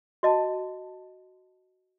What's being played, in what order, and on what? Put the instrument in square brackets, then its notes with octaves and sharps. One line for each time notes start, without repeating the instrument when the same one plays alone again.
[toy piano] F#4 D#5 A5